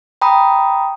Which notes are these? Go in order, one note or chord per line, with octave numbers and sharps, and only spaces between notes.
G5 A#5 B5 D#6